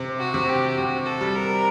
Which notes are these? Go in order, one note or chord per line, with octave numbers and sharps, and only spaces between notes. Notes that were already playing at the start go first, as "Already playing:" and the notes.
Already playing: C3
F#4
C3
G4
C3 F#4
A4
G3
A#4